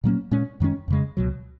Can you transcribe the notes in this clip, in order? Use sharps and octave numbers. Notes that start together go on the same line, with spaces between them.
A#2 F#3 A#3 C#4
A#2 G#3 C#4
F#2 D#3 G#3 C#4
F2 C#3 G#3
C#2 B2 F#3